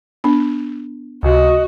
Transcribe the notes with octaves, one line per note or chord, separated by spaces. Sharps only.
B3 D4
C#2 C3 F#4 D#5